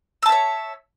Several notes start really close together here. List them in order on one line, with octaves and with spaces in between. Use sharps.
E6 A5 E5 C#5